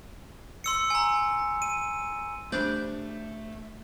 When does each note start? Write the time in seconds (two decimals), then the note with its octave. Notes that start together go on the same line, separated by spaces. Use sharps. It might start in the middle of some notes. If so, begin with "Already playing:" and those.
0.64 C6 E6 C#7
0.90 G#5 A#5
1.62 D#7
2.52 G3 A3 D4 C5 D5 G6